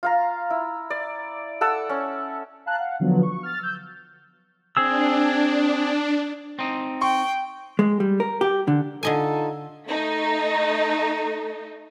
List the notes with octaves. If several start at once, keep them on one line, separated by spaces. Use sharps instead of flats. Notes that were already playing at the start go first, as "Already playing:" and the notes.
F4 F5 A#5
E4
D5
A4 F#5 A5 E6
C#4
F5 A5 A#5 F#6
F5 F#5
D3 F3 F#3 B3
C#6
F6 A6
E6 G6
C4 D4 G#4 E6
C4 D#4
G5 C6 C#6
G#3
G3
A#4
G4
D3
D3 D#4 F4 A4 D#5 G#5
A3 D#4